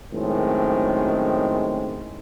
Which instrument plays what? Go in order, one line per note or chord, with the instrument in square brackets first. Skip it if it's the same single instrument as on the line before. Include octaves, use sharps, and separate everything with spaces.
[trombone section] F#2 A2 D#3 G#3 C4